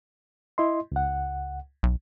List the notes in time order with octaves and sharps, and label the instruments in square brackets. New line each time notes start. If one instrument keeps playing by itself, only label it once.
[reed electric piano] E4 D#5 C6
C#2 F#5
[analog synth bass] B1